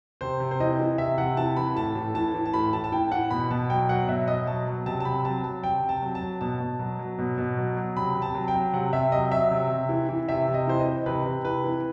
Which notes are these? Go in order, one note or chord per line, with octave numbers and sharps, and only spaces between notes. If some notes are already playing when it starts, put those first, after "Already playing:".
C3 C5
C3
C5
E3 D#5
E3
C3 E5
C3 F#5
E3 A5
E3 B5
A2 A5
A2
E3 A5
E3
A5
A2 B5
A2 A5
A5
E3 G5
E3 F#5
B2 B5
B2 A5
F#3 G5
F#3 F#5
B2 E5
B2 D#5
F#3 A5
F#3
C3 A5
A5
C3 B5
F#3 A5
F#3 A5
C3 G5
C3
A5
F#3
A5
F#3
B2 A5
B2
F#3
F#3
B2
B2
F#3
F#3
C3 B5
C3
A5
F#3
G5
F#3
C3 F#5
C3 E5
F#3 D#5
F#3 E5
C3
C3
E3
E3
C3 E5
C3
D#5
E3 C5
D#5
E3
C3 B4
C3
E3 B4
E3